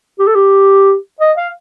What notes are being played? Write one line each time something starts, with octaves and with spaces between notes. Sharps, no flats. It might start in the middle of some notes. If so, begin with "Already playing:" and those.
G4
A4
G4
D#5
F5